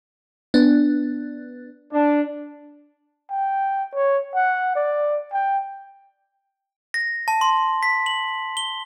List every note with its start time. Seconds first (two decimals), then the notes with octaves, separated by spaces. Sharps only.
0.54 B3 D4
1.92 D4
3.30 G5
3.95 C#5
4.35 F#5
4.76 D5
5.33 G5
6.94 A#6
7.28 A5
7.41 C6
7.83 B6
8.06 F#7
8.57 G7